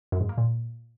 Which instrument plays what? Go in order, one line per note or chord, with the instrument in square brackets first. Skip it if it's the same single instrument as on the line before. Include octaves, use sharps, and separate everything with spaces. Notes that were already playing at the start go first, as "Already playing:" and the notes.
[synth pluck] F#2
G#2
A#3
A#2